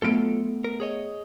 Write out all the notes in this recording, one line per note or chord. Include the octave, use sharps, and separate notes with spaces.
F#3 A3 B3 F4 A4 D7
A#4
G#4 C#5 D#5